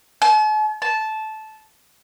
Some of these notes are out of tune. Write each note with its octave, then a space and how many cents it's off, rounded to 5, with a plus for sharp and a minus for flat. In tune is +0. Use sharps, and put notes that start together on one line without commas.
A5 -45
A5 -15